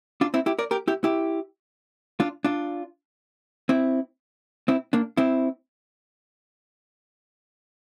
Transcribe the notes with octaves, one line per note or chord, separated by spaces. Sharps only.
D4 F4
C4 E4
E4 G4
A#4 D5
G4 A#4
E4 G4
E4 G4
D4 F4
D4 F4
C4 E4
C4 E4
A#3 D4
C4 E4